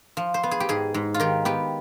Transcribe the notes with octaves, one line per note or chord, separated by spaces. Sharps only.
F3
C5
B3
G#4
G4
G#2 G#4
G#2
F4
D#3 G4
B3 G4